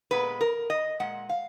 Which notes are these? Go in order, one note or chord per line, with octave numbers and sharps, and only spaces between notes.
A#2 G#3 B3 B4
A#4
D#5
A#2 G#3 F#5
F5